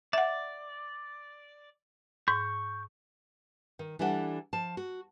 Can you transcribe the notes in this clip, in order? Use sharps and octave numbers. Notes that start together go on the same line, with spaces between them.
D5 E5 F#5
G#2 C#6 G6
D#3
E3 G3 D4 A4 D#5 F#5
F3 A5
F#4